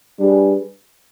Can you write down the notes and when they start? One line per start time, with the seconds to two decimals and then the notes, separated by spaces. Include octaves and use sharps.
0.18 G3 D4 G#4 B4